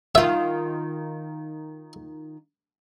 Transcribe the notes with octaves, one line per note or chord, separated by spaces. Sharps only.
D#3 F4 E5